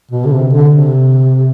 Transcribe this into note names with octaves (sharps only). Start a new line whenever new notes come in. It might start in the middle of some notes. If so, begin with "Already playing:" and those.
B2
D3
C3
D3
C3